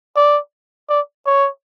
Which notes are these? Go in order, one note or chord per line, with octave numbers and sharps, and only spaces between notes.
D5
D5
C#5